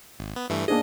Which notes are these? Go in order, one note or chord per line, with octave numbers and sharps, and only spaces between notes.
G#1
B3
G2 E3 A3
A#3 D4 G#4 D#5